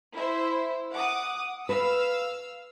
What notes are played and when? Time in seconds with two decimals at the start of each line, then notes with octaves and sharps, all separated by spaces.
0.15 E4 C5 E5
0.93 F#5 D6 D#6
1.69 B4 F5 E6